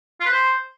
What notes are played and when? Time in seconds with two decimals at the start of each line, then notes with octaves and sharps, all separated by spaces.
0.20 F4
0.26 B4
0.31 C5